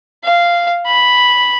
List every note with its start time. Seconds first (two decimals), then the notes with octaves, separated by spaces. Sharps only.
0.24 F5
0.86 B5